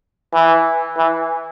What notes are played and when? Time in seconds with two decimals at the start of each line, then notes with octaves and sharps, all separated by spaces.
0.34 E3
0.97 E3